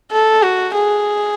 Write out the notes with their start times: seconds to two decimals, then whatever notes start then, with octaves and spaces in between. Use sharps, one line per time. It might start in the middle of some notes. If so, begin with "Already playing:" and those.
0.11 A4
0.43 F#4
0.74 G#4